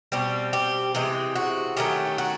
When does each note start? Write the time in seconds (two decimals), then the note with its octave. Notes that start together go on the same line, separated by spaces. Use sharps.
0.12 B2 G3 C4 G4
0.53 G4
0.95 C3 E3 G#3 G4
1.35 F#4
1.77 D#3 F#3 A3 C#4 G4
2.18 F#4